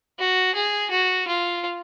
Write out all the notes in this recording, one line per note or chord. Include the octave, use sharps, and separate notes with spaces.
F#4
G#4
F#4
F4